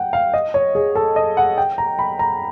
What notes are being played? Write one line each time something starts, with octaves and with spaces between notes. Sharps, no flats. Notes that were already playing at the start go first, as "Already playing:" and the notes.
Already playing: F#5 G5
F5
D#5
C#5
G#4
A4
D#5
F#5
G5
A#5
B5
A#5